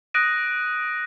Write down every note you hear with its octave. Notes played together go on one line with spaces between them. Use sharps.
D#6 F#6 A#6 D7 D#7